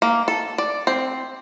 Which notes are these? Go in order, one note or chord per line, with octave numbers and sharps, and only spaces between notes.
A#3
A4
D5
C4